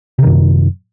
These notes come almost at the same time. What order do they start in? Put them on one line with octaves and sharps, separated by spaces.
C3 D#3 F#2